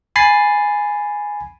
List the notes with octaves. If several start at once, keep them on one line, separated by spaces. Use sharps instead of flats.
G#5 B5 A6 C7